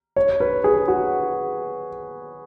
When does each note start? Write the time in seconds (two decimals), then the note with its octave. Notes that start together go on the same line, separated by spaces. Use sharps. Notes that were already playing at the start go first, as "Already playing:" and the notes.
0.16 C#5
0.40 B4
0.64 G#4
0.88 F#4